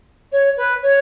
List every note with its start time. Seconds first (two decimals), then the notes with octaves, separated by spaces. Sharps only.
0.32 C#5
0.56 B4
0.82 C#5